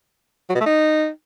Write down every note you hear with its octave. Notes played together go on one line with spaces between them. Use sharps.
F#3
B2
A3
D#4